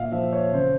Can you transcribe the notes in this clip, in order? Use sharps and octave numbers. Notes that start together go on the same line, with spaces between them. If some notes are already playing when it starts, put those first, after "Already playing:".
Already playing: A#2 E5 F5
F3 E5
C#5
C#3 C5